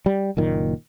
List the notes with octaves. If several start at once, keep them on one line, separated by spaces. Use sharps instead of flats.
G3
F#1 A#2 D#3